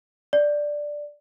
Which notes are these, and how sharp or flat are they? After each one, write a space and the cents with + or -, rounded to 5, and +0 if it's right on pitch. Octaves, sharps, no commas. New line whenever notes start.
D5 +0